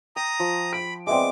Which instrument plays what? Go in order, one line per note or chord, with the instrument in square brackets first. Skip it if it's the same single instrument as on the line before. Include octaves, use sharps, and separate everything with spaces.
[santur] G5 [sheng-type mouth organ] A#5 D#6
[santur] F3
[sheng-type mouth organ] B5 [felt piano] D7
[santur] G#3 B3 C4 [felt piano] D5 E5 [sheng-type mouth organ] D6